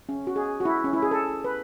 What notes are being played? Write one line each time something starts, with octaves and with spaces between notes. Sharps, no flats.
C#4
F#4
G#4
F#4
E4
C#4
E4
G#4
A4
B4